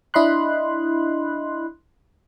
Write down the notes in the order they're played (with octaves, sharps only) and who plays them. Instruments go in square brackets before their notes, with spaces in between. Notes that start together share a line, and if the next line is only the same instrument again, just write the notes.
[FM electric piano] D4 E4 D#5 B5 C6 F#6